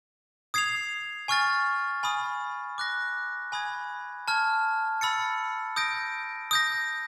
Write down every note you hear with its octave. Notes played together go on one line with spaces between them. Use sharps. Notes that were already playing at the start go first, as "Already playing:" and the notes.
D#6 G#6 C7 F7
G#5 C#6 F6 A6
G#5 B5 D#6
D6 F#6 A#6
G#5 B5 D#6 G#6
A5 C#6 F6 G#6
B5 E6 A6 C#7
D#6 G6 A#6 D7
D#6 G6 A#6